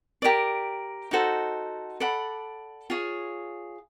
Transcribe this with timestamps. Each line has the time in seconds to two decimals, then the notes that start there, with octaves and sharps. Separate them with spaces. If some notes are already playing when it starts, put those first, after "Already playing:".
0.22 G4 A#4 D5
1.11 D#4 F#4 A4 C5
2.00 A4 D5 F#5 B5
2.90 F4 G#4 C#5